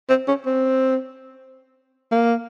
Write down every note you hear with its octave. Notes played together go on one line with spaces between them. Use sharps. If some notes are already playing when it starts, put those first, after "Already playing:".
C4
C#4
C4
A#3